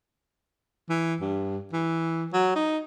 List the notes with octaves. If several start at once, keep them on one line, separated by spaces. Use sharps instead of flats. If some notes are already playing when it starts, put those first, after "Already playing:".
E3
G2
E3
F#3
D#4